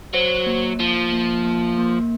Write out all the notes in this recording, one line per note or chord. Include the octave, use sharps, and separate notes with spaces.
F#3 C5
A#3
F3 A#3
A#3
A#3
A#3